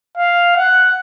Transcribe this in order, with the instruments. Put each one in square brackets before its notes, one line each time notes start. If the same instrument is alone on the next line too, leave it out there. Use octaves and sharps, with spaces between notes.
[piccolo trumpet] F5
F#5